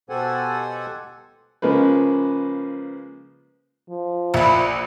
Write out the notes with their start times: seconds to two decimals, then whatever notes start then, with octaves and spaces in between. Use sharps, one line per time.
0.10 B2 G4 A4 C5 F#5 G#5
1.62 C#3 F3 G#3 A#3 B4
3.90 F3
4.34 A#1 E4 B4